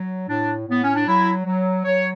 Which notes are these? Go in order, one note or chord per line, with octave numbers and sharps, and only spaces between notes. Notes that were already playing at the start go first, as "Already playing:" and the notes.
Already playing: F#3
A2 D4
A2 B3
C#4
D4
F#3 E4
F#3
F#3 C#5